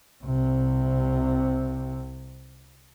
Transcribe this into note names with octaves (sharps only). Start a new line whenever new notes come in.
C2 C3